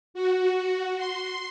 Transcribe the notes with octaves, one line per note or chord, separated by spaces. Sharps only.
F#4
C6